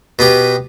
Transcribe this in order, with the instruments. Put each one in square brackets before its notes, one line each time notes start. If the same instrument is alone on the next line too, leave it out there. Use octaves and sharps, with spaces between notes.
[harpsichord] B2 B3 G4